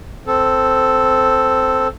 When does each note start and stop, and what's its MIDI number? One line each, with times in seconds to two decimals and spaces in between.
0.27 1.87 60
0.27 1.87 69